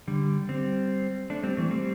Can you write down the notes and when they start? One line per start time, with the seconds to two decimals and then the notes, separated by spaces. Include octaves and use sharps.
0.08 D3 G3
0.49 G3 C4
1.30 A3 D4
1.43 G3 C4
1.57 E3 A3
1.71 G3 C4